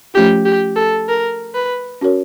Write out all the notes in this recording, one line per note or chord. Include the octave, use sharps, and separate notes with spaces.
F3 A3 C#4 F4 G4
G4
A4
A#4
B4
C#4 F#4 A#4 C#5